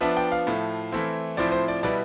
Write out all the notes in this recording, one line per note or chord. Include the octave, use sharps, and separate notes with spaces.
F3 B3 D4 E5
G5
F5
A2 F3 A3
E3 A3 C4 E4
A2 F3 C4 E4 D5
C5
D5
B2 G3 B3 E4 D5